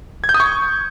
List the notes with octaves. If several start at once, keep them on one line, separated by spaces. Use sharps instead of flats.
G#6
G6
D#6
C#6